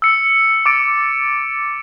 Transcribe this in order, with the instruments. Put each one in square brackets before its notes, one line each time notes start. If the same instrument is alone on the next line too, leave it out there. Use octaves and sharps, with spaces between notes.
[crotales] E6 C#7
D6 E6 A6 D7